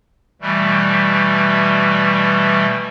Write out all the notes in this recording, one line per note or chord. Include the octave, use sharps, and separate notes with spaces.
B2 E3 G3 A3